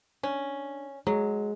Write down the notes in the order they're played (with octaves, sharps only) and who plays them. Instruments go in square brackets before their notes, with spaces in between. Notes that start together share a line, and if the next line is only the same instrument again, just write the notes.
[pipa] C#4 [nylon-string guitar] D4
[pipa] F#3 [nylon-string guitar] G#3